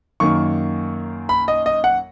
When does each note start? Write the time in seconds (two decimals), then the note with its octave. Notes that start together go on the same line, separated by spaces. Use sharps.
0.20 F#2 D#3 A#3 C#6
1.29 B5
1.48 D#5
1.66 D#5
1.84 F#5